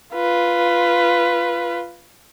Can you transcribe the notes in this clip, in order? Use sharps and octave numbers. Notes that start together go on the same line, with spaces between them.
F4 B4